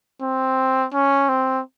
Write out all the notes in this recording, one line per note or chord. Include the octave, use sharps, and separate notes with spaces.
C4
C#4
C4